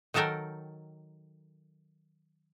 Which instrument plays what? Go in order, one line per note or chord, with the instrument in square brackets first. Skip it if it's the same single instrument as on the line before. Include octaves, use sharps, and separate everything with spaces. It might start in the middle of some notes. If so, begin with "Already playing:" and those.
[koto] D#3 F#3 A4 A#4 G5